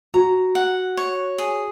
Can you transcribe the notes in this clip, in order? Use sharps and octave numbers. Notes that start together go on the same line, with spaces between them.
F#4 A#5
F#5
C#5
G#4